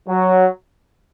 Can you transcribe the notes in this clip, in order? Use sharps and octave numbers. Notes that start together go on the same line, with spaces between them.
F#3